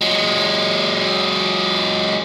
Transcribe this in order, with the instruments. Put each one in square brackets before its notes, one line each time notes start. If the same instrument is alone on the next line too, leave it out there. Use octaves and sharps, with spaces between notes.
[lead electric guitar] F#3 G#3